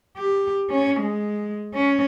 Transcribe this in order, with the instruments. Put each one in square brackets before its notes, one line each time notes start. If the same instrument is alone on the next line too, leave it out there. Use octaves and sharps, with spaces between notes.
[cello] G4
C#4
G#3
C#4